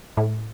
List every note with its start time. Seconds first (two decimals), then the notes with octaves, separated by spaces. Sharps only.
0.17 A2